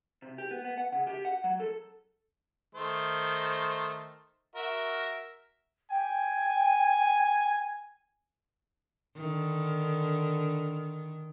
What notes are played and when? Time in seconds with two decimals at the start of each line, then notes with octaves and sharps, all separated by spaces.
0.22 C3
0.38 G4
0.51 B3
0.65 B3
0.78 F#5
0.92 C#3
1.07 G4
1.25 F#5
1.44 F#3
1.60 A4
2.75 D#3 A3 C5
4.55 F#4 A#4 E5
5.91 G5 G#5
9.16 D3 D#3